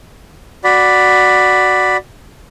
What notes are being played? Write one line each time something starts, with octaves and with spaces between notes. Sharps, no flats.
F#4 D5 B5